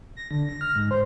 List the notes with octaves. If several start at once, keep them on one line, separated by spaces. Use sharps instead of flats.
A#6
D3
A#6
F6
G#2
C5